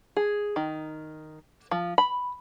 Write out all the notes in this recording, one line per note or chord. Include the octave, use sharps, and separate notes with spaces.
G#4
D#3
F3
B5